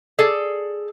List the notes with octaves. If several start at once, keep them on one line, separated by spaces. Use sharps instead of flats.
G#4 A4 D5